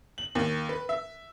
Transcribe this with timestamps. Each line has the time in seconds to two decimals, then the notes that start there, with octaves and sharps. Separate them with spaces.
0.18 F#7
0.35 D#2
0.69 B4
0.89 E5